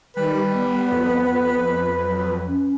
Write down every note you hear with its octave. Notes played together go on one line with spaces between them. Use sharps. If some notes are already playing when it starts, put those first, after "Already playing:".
D#3 G3 B4
B3
F2
F#3
C#4